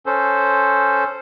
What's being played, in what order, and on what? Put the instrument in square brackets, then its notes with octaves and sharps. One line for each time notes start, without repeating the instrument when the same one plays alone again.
[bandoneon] C#4 A4 C5